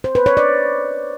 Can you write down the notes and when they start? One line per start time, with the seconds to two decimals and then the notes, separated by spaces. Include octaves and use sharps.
0.04 C5
0.15 B4
0.26 C#5
0.37 D5